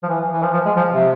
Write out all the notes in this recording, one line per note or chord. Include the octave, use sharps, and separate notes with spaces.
F3
E3
E3
F3
F3
G#3
F3
C3